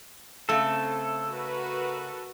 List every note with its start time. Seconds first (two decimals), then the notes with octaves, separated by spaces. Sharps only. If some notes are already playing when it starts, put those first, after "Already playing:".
0.49 C#3 A3 C4 A4
1.29 F#4 A#4 B4